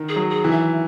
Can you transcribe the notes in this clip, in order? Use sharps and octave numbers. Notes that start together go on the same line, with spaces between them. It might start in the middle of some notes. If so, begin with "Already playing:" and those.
Already playing: D#3
G#4
F#3
G#4
E3
E5